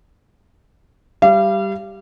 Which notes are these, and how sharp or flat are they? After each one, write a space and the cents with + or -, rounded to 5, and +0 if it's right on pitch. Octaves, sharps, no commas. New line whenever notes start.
G3 +0 F5 -40